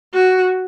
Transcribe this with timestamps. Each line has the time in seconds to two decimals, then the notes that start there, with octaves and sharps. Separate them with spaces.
0.14 F#4